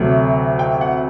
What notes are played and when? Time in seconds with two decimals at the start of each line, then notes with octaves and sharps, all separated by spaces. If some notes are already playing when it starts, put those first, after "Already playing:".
Already playing: D2 C3 F#3 A3
0.59 G5
0.81 F#5